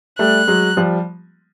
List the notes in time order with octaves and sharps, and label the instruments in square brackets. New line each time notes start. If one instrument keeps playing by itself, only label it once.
[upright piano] G3 A3 [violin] F#6
[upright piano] F#3 G#3
F3 G3